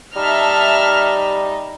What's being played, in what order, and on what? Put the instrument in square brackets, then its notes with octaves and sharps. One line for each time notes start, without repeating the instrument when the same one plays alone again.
[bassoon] G3 [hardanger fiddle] D#4 [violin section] E5 A5 F6